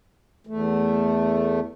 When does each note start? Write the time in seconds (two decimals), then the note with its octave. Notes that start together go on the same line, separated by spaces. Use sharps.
0.47 E2 A3